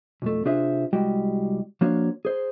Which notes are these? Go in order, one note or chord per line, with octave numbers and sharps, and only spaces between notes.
B1 F2 A3
C3 D4 F4 G#4 C5 E5
C2 G3 G#3 F#4 G5
F3 A#3 D4 F#4 C#5
G#4 C5